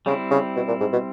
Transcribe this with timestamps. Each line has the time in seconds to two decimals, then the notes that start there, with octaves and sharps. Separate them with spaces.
0.06 C#3 G3 C4 E4
0.31 C#3
0.56 B2
0.68 A#2
0.80 G#2
0.93 B2